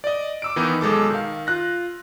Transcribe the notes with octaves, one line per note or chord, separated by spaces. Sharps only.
D5 D#5
D6 E6 D7
D#3 E3 B3 D#4
B1 G#3 A4 D6
D#3 F5
F4 F#6 A#6